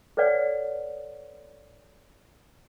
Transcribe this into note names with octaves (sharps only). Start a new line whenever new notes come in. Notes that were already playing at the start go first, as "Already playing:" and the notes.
A4 B4 C#5 D5 F#5